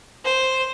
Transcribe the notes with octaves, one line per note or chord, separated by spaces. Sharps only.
C5